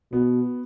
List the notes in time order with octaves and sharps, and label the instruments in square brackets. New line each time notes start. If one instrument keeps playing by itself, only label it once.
[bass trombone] B2 [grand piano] B3